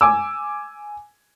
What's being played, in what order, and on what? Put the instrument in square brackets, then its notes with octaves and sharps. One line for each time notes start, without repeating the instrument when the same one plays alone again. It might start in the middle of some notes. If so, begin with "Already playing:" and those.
[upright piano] G#5 D6 E6